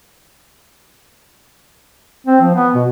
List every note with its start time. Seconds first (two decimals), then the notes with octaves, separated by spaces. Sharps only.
2.27 C4
2.41 F3
2.55 B3
2.75 B2